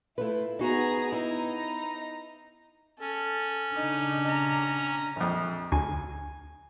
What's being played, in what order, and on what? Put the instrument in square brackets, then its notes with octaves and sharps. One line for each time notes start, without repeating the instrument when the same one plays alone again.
[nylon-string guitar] A3 F4 B4 [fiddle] E4
[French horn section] B3 [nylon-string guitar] D#4 F#4 [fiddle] G#4 A#5
[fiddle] D#4 A#5 [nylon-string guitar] E4
[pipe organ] C#4 [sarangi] A4
[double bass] C#3 D4 [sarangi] D#4
[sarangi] A#5
[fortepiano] A#1 F2
[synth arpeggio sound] D2 [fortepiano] G#5